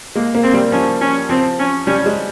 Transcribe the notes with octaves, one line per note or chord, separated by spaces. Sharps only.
G#3 A#3
A#3
C4
G3
F3 C#4
C#4
F3 C4
C#4
G3 C#4
G#3